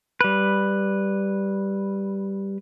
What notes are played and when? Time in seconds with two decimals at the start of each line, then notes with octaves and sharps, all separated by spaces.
0.21 G3 B4